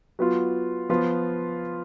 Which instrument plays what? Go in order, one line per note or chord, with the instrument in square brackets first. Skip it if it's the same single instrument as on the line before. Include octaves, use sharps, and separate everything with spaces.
[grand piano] F#3 B3 F4
F3 B3 F4